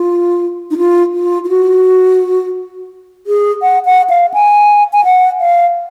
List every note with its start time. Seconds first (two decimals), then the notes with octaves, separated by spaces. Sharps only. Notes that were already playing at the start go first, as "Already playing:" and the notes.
Already playing: F4
0.71 D#4
0.78 F4
1.14 F4
1.44 F4
1.49 F#4
3.27 G#4
3.62 F#5
3.86 F#5
4.10 F5
4.34 G#5
4.93 G#5
5.05 F#5
5.40 F5